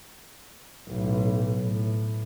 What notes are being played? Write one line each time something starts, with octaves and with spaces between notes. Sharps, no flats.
B1 A2
A2